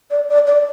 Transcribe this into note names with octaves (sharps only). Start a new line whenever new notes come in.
D5
D5
D5